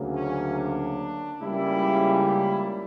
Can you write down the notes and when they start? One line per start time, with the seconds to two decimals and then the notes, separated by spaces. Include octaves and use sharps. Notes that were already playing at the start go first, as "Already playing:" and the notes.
Already playing: D2 C#3 F#3 A#3
0.15 C#4
0.57 D4
1.40 C#2 C#3 G3 A#3 E4
2.23 E4